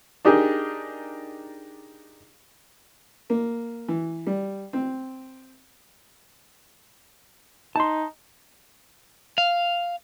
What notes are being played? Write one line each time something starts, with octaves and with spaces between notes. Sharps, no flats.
D4 D#4 G4 G#4 A#4
A#3
E3
G3
C4
D#4 A5 C6
F5